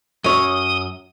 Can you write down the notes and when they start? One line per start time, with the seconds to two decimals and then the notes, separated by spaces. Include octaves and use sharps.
0.24 F#2 C#5 D#6